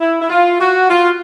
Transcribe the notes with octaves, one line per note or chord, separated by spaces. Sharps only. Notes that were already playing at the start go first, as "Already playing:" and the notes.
E4
E4
F4
F#4
F4